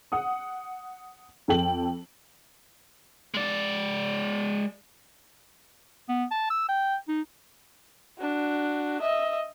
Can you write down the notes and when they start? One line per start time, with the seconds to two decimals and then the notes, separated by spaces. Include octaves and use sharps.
0.12 F#5 D#6
1.48 F2 A4 G5 F#7
3.34 G#3 D5
6.09 B3
6.31 A5
6.50 E6
6.69 G5
7.08 D#4
8.18 D4 F#4
9.01 D#5 E5